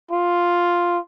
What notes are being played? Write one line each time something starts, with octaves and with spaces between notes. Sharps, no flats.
F4